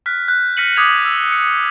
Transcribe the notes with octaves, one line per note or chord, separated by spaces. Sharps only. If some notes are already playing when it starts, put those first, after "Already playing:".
F6 F#6 B6
F#6 G6
F6 A#6 B6 C#7 D#7 F#7
D6 D#6 F#6 G#6 B6 F7
E6
C#7